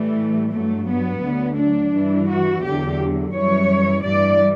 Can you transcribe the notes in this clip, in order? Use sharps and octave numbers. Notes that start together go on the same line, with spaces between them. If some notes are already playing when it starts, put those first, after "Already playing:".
Already playing: A2 E3 G3 A3
G2 F#3 A3
B3
D2 D3 F#3
D4
G2 E3 G3
F#4
E2 D3 F#3 G4
F#2 E3 G3 C#5
G2 E3 G3 D5